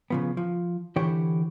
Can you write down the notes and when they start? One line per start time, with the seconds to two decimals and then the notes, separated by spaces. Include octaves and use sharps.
0.10 C#3 F3 B3
0.37 F3
0.96 D3 E3 E4 G4 C5 C#5